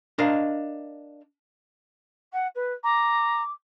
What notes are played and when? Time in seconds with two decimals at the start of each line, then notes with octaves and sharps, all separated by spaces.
0.18 D4 A#4 D#5 F5
2.32 F#5
2.55 B4
2.84 A#5 D6